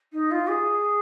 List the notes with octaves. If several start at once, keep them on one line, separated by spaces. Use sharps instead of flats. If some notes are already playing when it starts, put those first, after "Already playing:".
D#4
F4
G#4